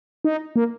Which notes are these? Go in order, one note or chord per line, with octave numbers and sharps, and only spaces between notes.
D#4
A#3